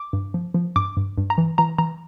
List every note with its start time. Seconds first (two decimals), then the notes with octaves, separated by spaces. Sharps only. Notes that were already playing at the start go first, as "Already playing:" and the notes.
Already playing: D6
0.13 G2
0.34 F3
0.54 F3
0.76 G2 D6
0.97 G2
1.18 G2
1.30 A#5
1.38 E3
1.58 E3 A#5
1.78 E3 A#5